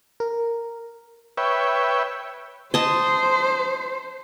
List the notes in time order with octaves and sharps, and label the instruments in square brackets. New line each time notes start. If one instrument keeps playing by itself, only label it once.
[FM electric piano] A#4
[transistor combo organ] B4 C#5 E5 G5
[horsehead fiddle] C5 [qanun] D#5 A5